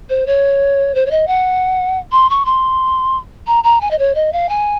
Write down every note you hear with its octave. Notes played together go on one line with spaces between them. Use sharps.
C5
C#5
C5
C#5
D#5
F#5
C6
C#6
C6
A#5
A#5
G#5
D#5
C#5
D#5
F5
G#5